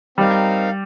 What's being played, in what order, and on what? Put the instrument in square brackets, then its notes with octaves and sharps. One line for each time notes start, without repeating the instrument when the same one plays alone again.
[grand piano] G3 [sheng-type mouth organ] C4 D#4 A#4 F5